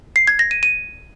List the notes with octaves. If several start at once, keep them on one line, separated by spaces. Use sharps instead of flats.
C7
G#6
A#6
D#7
D#7